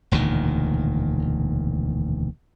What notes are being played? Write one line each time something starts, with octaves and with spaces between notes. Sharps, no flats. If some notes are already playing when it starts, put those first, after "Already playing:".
E1 D2 A#2 D#3